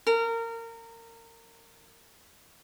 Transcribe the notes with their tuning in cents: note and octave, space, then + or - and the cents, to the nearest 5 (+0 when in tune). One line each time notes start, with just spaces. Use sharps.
A#4 -25